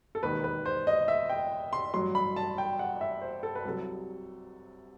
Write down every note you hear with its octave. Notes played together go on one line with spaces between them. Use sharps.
A4
E1 D#2 D#3 B4
B4
C5
D#5
E5
G5
C6
A1 G2 F#3 C6
B5
A5
G5
F#5
E5
C5
A4
B4
C2 C3 F#3 A4